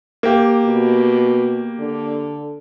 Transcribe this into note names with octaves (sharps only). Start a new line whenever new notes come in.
A#3 G4
B2
D3